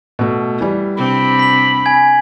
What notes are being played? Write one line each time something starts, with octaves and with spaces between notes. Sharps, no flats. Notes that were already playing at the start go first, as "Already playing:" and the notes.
B2 A3
E3 G3
C3 C4 D4 B5
B6 F#7
G#5 G#6